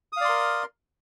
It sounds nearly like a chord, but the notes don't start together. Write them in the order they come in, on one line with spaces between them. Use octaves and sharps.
D#6 F5 D5 C6 A#4